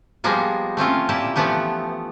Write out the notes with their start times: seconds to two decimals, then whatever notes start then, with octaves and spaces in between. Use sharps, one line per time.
0.24 F3 G3 G#3 A#3 B3
0.77 A3 C4 C#4 F4
1.09 A#2 E4 G4 A5
1.36 E3 F3 A3 B3 G4